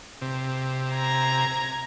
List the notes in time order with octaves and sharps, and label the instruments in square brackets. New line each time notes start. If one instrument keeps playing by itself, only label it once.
[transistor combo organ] C3
[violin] A#5 G#6